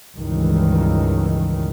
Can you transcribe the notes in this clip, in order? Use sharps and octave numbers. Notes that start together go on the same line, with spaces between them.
C#2 G2 D#3 E3